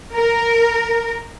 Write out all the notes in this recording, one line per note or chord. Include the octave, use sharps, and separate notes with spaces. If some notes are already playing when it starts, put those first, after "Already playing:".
A#4